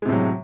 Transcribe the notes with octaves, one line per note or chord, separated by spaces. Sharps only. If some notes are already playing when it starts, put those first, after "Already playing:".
A2 C3 F#3 G#3